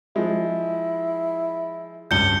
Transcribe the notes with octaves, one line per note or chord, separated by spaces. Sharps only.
F3 G#3 E4
C#2 G2 G6 C#7 G7